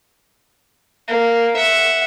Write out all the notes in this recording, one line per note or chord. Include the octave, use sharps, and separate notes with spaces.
A#3
E5 F#5